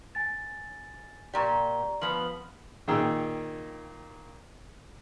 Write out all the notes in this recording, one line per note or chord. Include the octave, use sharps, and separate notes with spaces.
G#5 A6
A#2 G4 D5 A#5 C#6
F3 B3 F#7
A#2 D#3 D#4 G#4 G5 E6